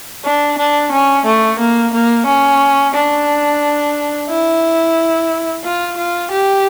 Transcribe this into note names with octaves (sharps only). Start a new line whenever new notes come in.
D4
D4
C#4
A3
A#3
A#3
C#4
D4
E4
F4
F4
G4